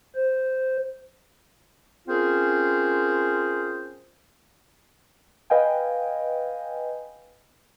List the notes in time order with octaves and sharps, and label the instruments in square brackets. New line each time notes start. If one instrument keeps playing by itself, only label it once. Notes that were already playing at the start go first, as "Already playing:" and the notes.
[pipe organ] C5
[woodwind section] C4 C#4 F4 G#4 A#4 C5
[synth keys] B4 D#5 F5 G5 G#5